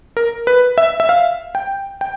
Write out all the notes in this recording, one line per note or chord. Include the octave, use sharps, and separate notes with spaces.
A#4
B4
E5
E5
F5
G5
G5